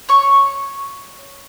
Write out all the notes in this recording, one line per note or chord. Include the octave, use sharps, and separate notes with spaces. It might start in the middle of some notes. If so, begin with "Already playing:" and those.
C#5 C#6